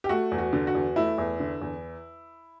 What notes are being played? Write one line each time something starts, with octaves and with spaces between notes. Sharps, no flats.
G4
A3 F#4
E2
F#4
D3
F#4
E2
A3 E4
E2
D3
E2